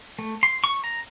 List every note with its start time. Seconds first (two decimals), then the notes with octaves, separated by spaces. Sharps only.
0.19 A3
0.43 C6
0.64 C#6
0.84 A#5